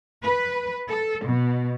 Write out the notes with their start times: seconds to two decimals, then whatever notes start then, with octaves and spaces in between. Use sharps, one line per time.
0.24 B4
0.87 A4
1.26 B2